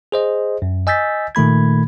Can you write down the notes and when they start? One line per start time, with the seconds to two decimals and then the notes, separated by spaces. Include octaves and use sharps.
0.12 G#4 C5 D#5
0.62 F#2
0.87 D#5 G#5 E6 G6 A6 B6
1.35 A#2 D#3 A3 B5 G#6